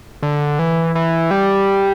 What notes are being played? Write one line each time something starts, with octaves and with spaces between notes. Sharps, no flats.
D3
E3
E3
G3